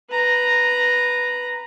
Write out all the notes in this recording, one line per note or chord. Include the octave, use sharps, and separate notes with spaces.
B4 A#5